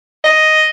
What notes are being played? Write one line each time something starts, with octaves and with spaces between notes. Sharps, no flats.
D#5